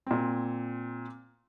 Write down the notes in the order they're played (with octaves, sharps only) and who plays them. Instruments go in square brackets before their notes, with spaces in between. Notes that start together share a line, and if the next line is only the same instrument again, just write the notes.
[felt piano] A#2 C4